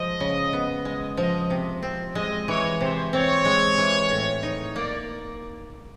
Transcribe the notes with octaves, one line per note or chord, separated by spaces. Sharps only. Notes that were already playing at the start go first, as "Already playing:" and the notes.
Already playing: F3 G#3 D#5
C#3
B3
G#3 D#5
F3 D#5
C3
C4
G#3 D#5
E3 C#5
C3 C5
C4 C#5
G#3
E3
A2
D#4
A#3 D5